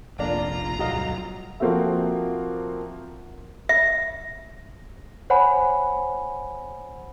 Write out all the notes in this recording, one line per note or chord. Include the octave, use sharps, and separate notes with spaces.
F1 A#1 A#3 D4 F4 A#5
D1 B1 G2 F#3 D#5 F5
F3 A#3 C4 F#4 A4 E5
E5
C5 C#5 F#5 G#5 B5